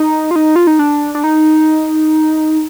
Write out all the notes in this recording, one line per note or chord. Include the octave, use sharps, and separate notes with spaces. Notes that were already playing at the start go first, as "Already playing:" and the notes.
Already playing: D#4
F4
D#4
F4
D#4
D4
D4
D#4